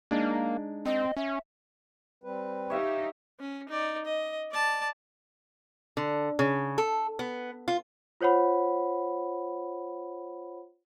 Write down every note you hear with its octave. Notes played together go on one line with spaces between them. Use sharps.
G#3 A#3 D4 D#4
C4 D#5
C#4 E5
G3 C4 B4
D#4 G4 C#5 E5 F5
C#4
D#4 D5
D#5
D5 A5
D3
C#3
A4
B3
F4
F4 C5 C#5 F#5 B5